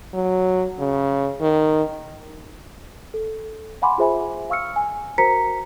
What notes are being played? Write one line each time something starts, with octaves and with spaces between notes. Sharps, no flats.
F#3
C#3
D#3
A4
F5 F#5 G#5 B5 C6 D6
F4 G#4 C5 E5 G#5 B5
F5 C#6 E6 F6 C#7
G#5
F#4 A#4 C5 A#5 B6 C#7